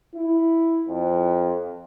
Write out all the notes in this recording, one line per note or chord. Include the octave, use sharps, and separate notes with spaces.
E4
F2